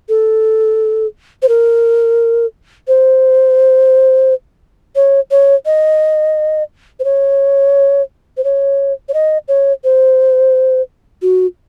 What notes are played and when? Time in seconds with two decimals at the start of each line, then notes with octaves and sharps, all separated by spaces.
0.09 A4
1.42 C5
1.49 A#4
2.88 C5
4.96 C#5
5.31 C#5
5.66 D#5
7.00 C5
7.04 C#5
8.37 C5
8.44 C#5
9.09 C#5
9.14 D#5
9.48 C#5
9.84 C5
11.22 F#4